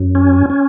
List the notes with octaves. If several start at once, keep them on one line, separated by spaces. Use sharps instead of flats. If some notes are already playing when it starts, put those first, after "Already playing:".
Already playing: F#2
C#4
C#4